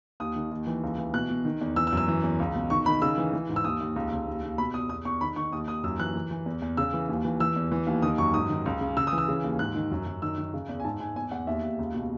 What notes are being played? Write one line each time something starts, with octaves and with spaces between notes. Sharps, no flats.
D#2 D#6
D#3
D#2
E3
C#2
E3
B2 F#6
B2
D#3
E2
E3 E6
E6
F#2
E6
E3
E2
C#2
B2
D#3 C#6
D#3 B5
C#3 E6
E3
E3
G#2
E6
D#2 D#6
D#2
C#2
C#2
D#2
D#2
B2 B5
E2 D#6
E2 D#6
E2 C#6
D#3 B5
D#3 C#6
D#2 D#6
D#2 D#6
F#2 E6
E3 F#6
E3
E3
E2
E2
C#3 E6
E3
D#2
E3
E3 E6
E2
E3
D#2
D#3 D#6
F#2 C#6
G#2 D#6
D#3
C#2
C#3
C#3 E6
D#6
E3
E6
C#3
D#2
G#2 F#6
D#3
F#2
F#2
D#3 E6
D#3
C#3
E2
G#5
G#2 A5
G#2 G#5
E2 G#5
E2 F#5
D#2 E5
D#2
C#2
B2